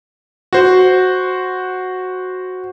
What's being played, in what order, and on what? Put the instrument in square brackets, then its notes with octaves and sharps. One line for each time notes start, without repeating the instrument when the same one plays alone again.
[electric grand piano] F#4 C5